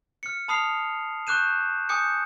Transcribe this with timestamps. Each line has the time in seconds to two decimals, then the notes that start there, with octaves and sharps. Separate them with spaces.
0.23 F6 C#7
0.48 A5 B5 D#6 F6 C7 F7
1.27 C#6 D6 F#6 G6 D#7 E7
1.89 G#5 D6 D#6 G6 C#7